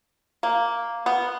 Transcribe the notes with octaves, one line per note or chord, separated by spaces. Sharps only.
A#3
B3